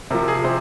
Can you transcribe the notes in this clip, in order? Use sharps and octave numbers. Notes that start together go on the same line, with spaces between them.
C3 F3 A#4
G#4
C3 C5